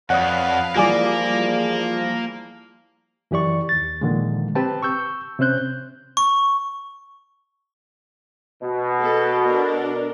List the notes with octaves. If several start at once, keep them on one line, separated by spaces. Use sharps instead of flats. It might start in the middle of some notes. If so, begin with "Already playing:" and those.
F2 B4 C#5 D5 F5 F#5 D#6
E3 F3 G3 G#3 A#3 F4 G#4 D5
F#2 E3 G4 D5 C#6
D#2 A6
A#2 D3 D#3 F3 G#3
C4 G4 B4 G5 A5
C#6 E6 G6
C3 C4 C#4 C5 F#6 G6
C#6
B2
B3 G#4 A4
D4 A4 A#4